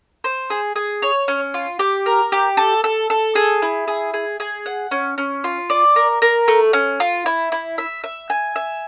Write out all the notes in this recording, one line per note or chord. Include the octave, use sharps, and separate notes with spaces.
C5
G#4
G#4
C#5
C#4
F4
G4
A#4
G4
A4
A4
A4
G#4
E4
G#4
G#4
G#4
F#5
C#4
C#4
F4
D5
A#4
A#4
A3
C#4
F4
E4
E4
E5
E5
G#5
E5